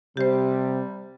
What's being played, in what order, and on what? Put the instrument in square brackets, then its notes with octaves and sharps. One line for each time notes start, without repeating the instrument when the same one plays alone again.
[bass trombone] C3 [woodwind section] G3 [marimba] G4 C5